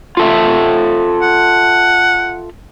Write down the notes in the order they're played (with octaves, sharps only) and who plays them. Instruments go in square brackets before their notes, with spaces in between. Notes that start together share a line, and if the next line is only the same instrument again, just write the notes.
[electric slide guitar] F4 A4 E5
[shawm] F#5